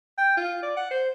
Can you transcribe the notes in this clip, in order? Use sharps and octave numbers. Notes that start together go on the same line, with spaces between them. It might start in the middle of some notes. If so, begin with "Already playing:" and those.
G5
F4
D5
F#5
C5